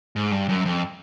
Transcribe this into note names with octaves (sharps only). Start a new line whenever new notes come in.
G#2
G2
F#2
F2